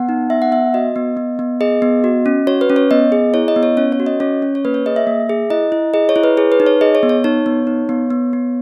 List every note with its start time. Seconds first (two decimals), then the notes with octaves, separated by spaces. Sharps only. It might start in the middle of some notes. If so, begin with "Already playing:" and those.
Already playing: B3 F#5
0.09 D#4
0.30 B3 E5
0.42 F#5
0.52 B3 E5
0.74 F#4 D#5
0.96 B3
1.17 B3
1.39 B3
1.61 G#4 D#5
1.82 B3
2.04 F#4
2.26 C#4
2.47 F#4 C#5
2.61 B4
2.70 C#4
2.76 C#5
2.91 B3 D#5
3.12 G#4
3.34 E4 C#5
3.48 D#5
3.56 B3
3.63 C#5
3.77 C#4 C#5
3.92 C#5
4.00 F#4
4.06 D#5
4.20 C#4 C#5
4.42 C#4
4.55 C#5
4.65 A#3 B4
4.74 C#5
4.86 G#4 D#5
4.96 E5
5.07 A#3
5.29 G#4
5.50 E4 D#5
5.72 E4
5.94 G#4 D#5
6.09 C#5
6.16 E4
6.24 B4
6.37 G#4 C#5
6.52 B4
6.60 D#4
6.66 C#5
6.81 G#4 D#5
6.95 C#5
7.03 B3
7.09 C#5
7.24 D#4 C#5
7.46 B3
7.67 D#4
7.89 B3
8.10 B3
8.33 B3